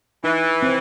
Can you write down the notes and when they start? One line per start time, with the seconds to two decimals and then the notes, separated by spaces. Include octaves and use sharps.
0.24 E3 D#4
0.62 C4